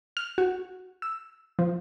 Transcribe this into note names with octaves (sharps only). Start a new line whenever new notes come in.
F6
F#4
E6
F3